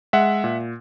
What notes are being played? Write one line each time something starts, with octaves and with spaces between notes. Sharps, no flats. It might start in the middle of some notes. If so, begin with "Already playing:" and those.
G#3 E5 F#5
A#2